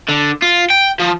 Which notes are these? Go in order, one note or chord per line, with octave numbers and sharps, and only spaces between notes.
D3
F4
G5
F3